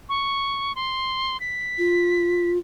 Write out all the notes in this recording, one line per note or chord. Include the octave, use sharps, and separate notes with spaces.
C#6
C6
B6
F4